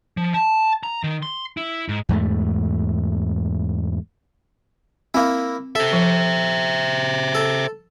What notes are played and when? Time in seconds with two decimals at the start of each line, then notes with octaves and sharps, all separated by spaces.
0.17 F3
0.34 A5
0.83 A#5
1.03 D#3
1.23 C6
1.57 E4
1.89 G#2
2.09 E2 G#2 A3
5.14 A#3 C4 E4
5.76 A4 C5 E5
5.93 F3
7.35 A4